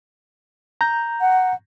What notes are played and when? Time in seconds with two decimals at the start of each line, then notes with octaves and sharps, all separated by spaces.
0.81 A#5 G6
1.21 F#5